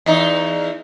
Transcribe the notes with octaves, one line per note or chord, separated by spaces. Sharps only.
E2 D#4